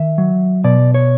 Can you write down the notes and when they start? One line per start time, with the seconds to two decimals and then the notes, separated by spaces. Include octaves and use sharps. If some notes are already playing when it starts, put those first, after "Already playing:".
Already playing: D#3 E5
0.18 F#3
0.64 B2 D5
0.94 C#5